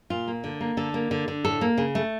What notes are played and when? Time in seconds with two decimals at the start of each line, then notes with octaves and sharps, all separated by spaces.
0.10 A#2 F4
0.28 A#3
0.44 D3
0.61 A#3
0.77 D3 A4
0.94 A#3
1.11 D3
1.28 D3
1.44 A2 A4
1.61 A#3
1.78 C#3
1.95 A3